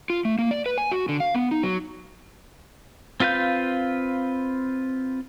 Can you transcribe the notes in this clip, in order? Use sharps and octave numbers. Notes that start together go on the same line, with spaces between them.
F4
A3
A#3
D5
B4
G#5
F#4
D3
F5
B3
D#4
F#3
C4 F4 B4 F5 G6